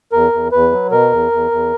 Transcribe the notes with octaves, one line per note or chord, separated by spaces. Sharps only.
E2 A#4
E2
E2 B4
F#3
B2 A#4
E2
E2
E2